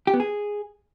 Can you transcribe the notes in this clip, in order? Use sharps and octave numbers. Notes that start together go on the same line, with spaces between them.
G4
B3
G#4